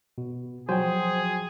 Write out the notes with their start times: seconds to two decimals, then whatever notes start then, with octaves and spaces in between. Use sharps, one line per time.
0.18 B2
0.69 F3 F#3 F#4 G#4 C5 G5 G#5